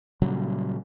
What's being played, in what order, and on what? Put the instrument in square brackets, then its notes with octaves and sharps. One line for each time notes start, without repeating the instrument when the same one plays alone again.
[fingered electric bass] A#2 C#3 F#3 G3